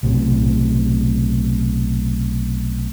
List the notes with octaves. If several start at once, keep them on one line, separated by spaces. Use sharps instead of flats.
B1 A2 C3